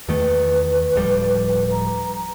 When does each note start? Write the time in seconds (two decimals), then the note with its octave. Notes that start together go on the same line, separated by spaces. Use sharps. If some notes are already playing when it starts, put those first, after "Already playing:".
0.08 E2 D#3 A3 B4
0.95 D1 F3 G3
1.71 A#5